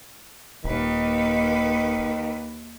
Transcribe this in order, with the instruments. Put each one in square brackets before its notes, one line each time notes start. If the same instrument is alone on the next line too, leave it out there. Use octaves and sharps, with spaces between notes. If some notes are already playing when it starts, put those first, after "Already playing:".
[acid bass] D#1 [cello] D#2 B4 [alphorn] D#3